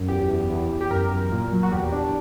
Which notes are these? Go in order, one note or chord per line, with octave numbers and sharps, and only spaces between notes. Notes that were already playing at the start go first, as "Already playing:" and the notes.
Already playing: F#2
E2 G4
E2
E2
E2
G4
F#2 A#4
F#2
A#2
F#3
F#4
E2 G4
E2 D4